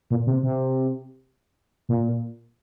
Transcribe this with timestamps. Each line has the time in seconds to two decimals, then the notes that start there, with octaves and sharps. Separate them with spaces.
0.10 A#2
0.27 C3
0.43 C3
1.89 A#2